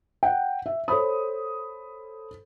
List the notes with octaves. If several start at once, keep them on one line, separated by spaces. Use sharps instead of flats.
F#5 G5
E5
A4 C5 C#5 B5 D#6